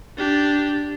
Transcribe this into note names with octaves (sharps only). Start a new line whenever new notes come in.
D4 G4